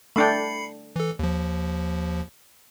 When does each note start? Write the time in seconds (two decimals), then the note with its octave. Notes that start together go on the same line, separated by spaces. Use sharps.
0.16 A3 D4 G5 B5 C7 C#7
0.96 E3 A4
1.19 D#2 F3